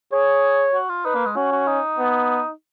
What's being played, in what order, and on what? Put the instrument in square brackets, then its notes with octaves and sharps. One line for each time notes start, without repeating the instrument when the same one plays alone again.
[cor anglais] G#4 [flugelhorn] C#5
[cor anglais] F#4
F4
[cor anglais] D#4 [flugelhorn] B4
[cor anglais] A#3
G#3
[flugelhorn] C#4 [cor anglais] F#4
[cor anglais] F#4
D#4
[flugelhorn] B3